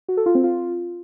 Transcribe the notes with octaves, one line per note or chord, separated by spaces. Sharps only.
F#4
A4
F4
C4
F4